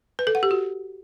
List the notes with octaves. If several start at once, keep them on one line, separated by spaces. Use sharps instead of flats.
B4
A4
F#5
G4
F#4